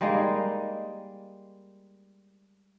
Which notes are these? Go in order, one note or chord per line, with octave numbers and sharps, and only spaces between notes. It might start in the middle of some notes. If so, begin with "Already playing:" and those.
G3 G#3 A#3 D#4